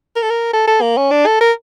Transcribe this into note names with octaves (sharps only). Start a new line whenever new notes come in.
A#4
A4
A#4
A4
A4
A#3
C#4
D4
A4
A#4